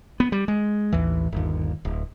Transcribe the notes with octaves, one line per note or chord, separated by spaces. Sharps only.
B3
G3
G#3
A1 D#2 E3
G1 D#2
D1